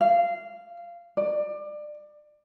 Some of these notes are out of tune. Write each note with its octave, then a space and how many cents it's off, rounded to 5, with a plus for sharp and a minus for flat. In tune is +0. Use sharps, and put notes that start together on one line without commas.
F5 -15
D5 +25